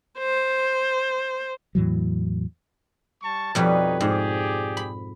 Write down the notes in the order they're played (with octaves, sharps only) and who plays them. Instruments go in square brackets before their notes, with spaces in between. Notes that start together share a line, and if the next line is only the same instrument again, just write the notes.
[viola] C5
[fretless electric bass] E2 A2 E3 F#3
[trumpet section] G3 A5 C#6
[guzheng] F2 B2 G3 [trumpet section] D#4 B4 C#5
[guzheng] G#2 [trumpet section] G4 G#4 D5
[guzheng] B5